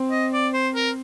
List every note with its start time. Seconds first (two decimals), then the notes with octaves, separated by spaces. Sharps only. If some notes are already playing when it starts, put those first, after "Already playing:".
Already playing: C4
0.11 D#5
0.33 D5
0.54 C5
0.75 A#4